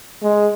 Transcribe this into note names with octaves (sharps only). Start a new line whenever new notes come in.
G#3